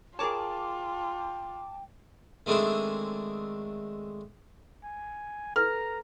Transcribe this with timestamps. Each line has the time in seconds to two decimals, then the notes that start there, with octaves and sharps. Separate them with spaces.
0.19 F4 G#4 A#4 C#5 G5 A5 D6
2.46 D#3 G#3 A3 C4 D4 E4
4.84 G#5
5.56 A4 B4 A#5 F6